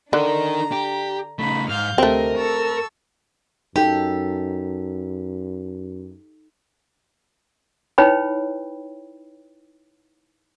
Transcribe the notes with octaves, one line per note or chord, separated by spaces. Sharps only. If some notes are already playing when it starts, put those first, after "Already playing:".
D3 D4 D#4 A#4 A#5
G4
C#3 A3 D#4 B5
G#2 F5 F6 G6
D2 C3 A3 C4 A#4 D#5
A4 C#6 E6
F#2 D#4 G4 A4
D#4 E4 B4 C#5 G5 B5